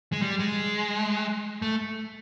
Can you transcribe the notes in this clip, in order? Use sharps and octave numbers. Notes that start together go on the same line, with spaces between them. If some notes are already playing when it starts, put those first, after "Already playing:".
G#3
G3
G#3
A3